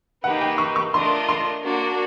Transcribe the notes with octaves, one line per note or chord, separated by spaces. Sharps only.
A#3 D#4 G4 B4 F#5
G5
C#6
C#6
A3 D4 F4 A#4 D#5 C6
C6
A#3 D4 F#4